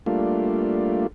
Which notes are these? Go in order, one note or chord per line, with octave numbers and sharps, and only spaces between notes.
G3 A3 A#3 D4 F4